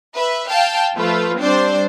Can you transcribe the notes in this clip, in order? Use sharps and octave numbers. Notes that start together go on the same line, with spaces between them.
B4 E5
F5 G5 A5
F3 A3 F4 B4
G3 C4 D4 C5 D5